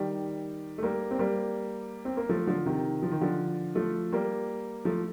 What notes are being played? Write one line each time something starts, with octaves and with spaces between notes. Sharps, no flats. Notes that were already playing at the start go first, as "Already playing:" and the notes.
Already playing: D#3 G3
A3
G3 A#3
C4
G3 A#3
C4
A#3
F3 A3
D3 F3
C3 D#3
F3
D#3
D3 F3
F3 A3
G3 A#3
F3 A3